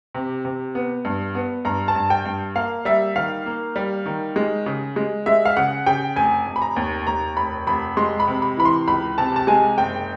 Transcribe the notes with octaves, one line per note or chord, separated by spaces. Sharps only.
C3
C3
B3
G2
B3
G2 A#5
A5
G2
G5
G2
A#3 F5
G3 E5
D#3 F5
A#3
G3
D#3
G#3
C#3
G#3
G#3 E5
F5
C#3 F#5
C#3 G5
F1 G#5
F1
B5
A#5
D#2
D#2 A#5
F1 B5
F1 B5
G#3 C6
B5
C3
B5
E3 B5
C6
C#2 B5
C3 A5
A5
G#3 G#5
F#1 G5